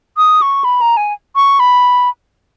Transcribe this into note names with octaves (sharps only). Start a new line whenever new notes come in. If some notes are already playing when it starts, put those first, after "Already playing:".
D#6
C#6
B5
A#5
G#5
C#6
B5